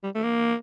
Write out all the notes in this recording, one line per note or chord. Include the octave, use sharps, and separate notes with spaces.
G3
A3
A#3